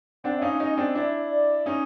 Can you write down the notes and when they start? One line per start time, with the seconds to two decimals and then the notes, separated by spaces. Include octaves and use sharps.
0.24 C4 D4 F#5
0.38 E5
0.41 C#4 D#4 F5
0.60 C#4 D#4 D#5
0.77 C4 D4
0.95 D4 E4 D5
1.31 D5
1.66 C#4 D#4